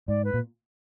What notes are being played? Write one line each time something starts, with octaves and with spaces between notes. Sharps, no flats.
G#2 D5
B4
A#2